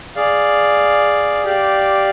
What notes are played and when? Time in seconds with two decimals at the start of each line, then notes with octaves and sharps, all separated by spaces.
0.16 G#4 D5 F5
1.45 G4 D5 F5